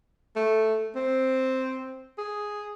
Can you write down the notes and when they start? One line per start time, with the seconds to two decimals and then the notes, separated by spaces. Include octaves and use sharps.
0.36 A3
0.95 C4
2.18 G#4